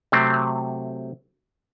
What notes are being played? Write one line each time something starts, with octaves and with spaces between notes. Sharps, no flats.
C3 F#3 A3 C4